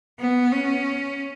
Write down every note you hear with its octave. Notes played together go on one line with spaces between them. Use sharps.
B3
C#4